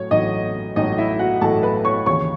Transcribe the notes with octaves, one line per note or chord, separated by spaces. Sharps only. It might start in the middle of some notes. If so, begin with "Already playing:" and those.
Already playing: A2 F#3 C#5
A1 A2 F#3 D#4 D#5
A1 A2 F#3 D#4 D#5
E4 E5
F#4 F#5
A1 A2 F#3 A4 A5
B4 B5
C#5 C#6
D#2 C#3 E3 C#5 C#6